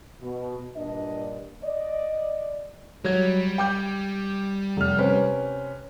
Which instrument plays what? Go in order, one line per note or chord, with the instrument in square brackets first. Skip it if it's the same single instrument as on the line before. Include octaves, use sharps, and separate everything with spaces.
[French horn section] B2
G2 A#2 D4 D#5
D5 D#5
[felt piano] F#3 G#6 [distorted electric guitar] G3
[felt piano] G5 D6 G6
[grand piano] F1 F6
[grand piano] C3 B4 C5 [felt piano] C#4